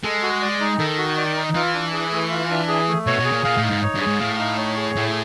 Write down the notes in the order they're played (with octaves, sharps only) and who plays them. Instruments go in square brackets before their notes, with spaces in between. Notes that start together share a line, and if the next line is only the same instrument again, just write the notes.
[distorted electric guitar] G#3 [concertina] A4
[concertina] F#4
D5
D#4
[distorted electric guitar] D#3 [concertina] A4
[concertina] F#4
D5
D#4
[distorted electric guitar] E3 [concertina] F4
[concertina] D4
G#4
A3
F4
D4
G#4
A3
[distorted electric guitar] B2 [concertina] C#5
[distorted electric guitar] B2
[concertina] G#4
[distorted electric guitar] A#2
[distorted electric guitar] A#2 [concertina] F5
[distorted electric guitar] A2
[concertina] D#4
[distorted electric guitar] G#2
[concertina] C#5
[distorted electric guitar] G2
[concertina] G#4
[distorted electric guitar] G#2
[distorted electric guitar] A2 [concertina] F5
[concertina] D#4
C#5
G#4
[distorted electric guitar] A2 [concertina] E4